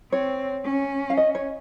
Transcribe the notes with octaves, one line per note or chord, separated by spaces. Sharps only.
C4 C#5
C#4
F5
D#5
C#5